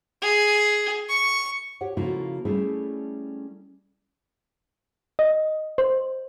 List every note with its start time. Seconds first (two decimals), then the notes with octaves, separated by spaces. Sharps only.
0.22 G#4
1.09 C#6
1.81 G4 C#5 F#5
1.97 C#3 F3 A#3 E4 F#4 A4
2.45 G3 A3 C#4 E4 G#4 A4
5.19 D#5
5.78 C5